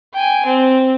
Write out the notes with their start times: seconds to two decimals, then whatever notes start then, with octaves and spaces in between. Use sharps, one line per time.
0.13 G5 G#5
0.46 C4